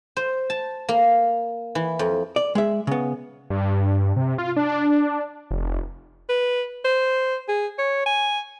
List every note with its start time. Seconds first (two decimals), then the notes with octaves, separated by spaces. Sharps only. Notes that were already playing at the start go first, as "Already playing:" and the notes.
0.17 C5
0.50 A5
0.89 A#3
1.75 E3
1.99 F2
2.36 D5
2.55 G#3 E5
2.87 C#3 B3
3.50 G2
4.16 C3
4.38 F4
4.56 D4
5.51 F1
6.29 B4
6.85 C5
7.48 G#4
7.78 C#5
8.06 G#5